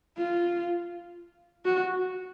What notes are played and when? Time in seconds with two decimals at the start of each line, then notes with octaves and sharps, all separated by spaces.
0.17 F4
1.65 F#4